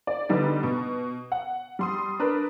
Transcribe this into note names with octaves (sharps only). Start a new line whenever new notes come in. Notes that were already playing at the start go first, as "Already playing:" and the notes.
D5
D3 G3 B3 D4 D#4
B2
F#5
G3 C6 D#6
D4 A#4 B4